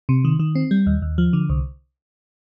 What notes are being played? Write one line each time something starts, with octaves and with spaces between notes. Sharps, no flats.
C3
D#3
D#3
C4
G3
D#2
D#2
F3
D3
C2